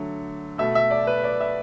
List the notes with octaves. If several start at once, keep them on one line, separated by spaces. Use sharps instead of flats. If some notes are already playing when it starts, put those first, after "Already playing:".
Already playing: D3 F#3 A3
B2 A3 E5
E5
D5
B4
D5
E5